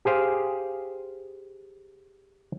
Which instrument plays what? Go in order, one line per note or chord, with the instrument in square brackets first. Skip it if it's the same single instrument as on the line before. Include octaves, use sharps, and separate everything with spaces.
[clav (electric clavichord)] G4 G#4 C5 F5